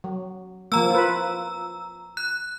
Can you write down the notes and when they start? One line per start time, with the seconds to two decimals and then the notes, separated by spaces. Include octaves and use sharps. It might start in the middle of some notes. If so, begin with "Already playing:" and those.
0.04 F#3
0.72 F3 A#3 A#5 E6
0.90 F4 B4
2.17 F#6